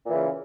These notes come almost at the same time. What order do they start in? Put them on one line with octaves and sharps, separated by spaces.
A#2 E3 C#3